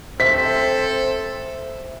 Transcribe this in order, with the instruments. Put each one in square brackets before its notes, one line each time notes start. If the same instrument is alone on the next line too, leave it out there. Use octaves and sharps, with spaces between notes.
[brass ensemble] C4 A4 [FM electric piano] C5 E5 [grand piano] B6